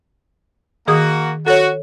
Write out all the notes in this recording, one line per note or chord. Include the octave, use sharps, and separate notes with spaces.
D#3 A#3 F#4 G#4 D#6
F#4 A4 C#5